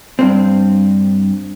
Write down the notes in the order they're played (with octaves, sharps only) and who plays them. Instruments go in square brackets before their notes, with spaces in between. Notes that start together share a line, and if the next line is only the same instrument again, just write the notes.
[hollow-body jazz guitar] G2 C4